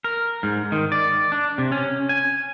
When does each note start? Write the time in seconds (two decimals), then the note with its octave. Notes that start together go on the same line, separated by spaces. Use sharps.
0.04 A#4
0.43 G#2
0.72 D#3
0.92 D5
1.32 D4
1.58 C3
1.72 C#4
2.09 G#5